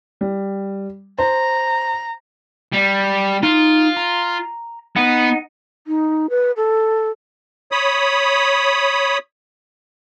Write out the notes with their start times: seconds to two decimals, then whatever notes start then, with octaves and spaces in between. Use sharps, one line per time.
0.21 G3
1.18 C5 A#5
2.73 G3
3.43 D#4 F4
3.97 A#5
4.96 B3 D#4 F#5
5.87 D#4
6.30 B4
6.57 A4
7.72 C#5 B5 D#6